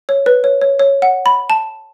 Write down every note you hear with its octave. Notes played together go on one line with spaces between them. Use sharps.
C#5
B4
C#5
C#5
C#5
F#5
B5
A5